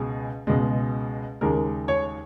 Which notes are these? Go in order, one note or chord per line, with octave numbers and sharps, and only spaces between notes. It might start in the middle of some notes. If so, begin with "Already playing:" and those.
Already playing: C#2 B2 G#3 G#4
C#2 B2 G#3
D#2 C#3 G#3 A#4
C#5